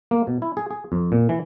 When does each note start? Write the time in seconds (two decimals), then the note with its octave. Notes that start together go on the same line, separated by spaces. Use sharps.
0.11 A#3
0.27 B2
0.42 E4
0.57 G#4
0.71 G#4
0.92 F2
1.12 A#2
1.29 E3